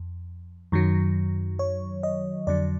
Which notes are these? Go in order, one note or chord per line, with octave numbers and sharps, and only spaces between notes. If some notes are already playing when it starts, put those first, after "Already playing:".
Already playing: F2
F#2 D#3 F#3
C#5
D#5
F2 D3 F#3 D5